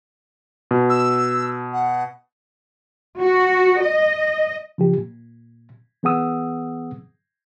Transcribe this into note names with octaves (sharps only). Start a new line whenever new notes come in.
B2
E6
F#5
F#4
D#5
C#3 F3 G4
A#2
E3 B3 G#4 F#5 D#6 E6